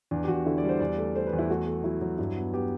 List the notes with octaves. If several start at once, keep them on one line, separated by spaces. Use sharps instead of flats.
E2 D4
G4
E2 F#4
D3 E4
D5
G3
C5
E2 D5
A3
A3 C5
B4
E2
E4
A3 F#4
A3
F#3 E4
F#3
G2 E4
B3
B3 G4